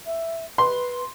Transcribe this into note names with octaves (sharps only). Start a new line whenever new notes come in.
E5
B4 C6